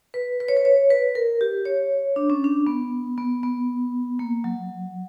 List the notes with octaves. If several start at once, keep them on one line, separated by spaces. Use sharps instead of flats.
B4
B4
C#5
B4
C#5
B4
A#4
G4
C#5
D4
C#4
D4
B3
B3
B3
A#3
F#3